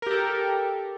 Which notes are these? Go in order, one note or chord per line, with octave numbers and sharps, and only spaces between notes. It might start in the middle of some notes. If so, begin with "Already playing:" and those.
G4 A4 A#4